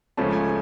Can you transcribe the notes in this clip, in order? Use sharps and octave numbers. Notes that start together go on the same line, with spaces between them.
C#2 C#3 F3 A3 C#4 A5
G#5